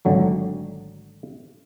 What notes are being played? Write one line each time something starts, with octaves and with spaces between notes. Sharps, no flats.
G#1 D3 F#3 A3